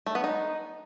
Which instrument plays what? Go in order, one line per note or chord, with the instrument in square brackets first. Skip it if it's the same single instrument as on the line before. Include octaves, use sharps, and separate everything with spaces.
[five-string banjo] A3
B3
D#4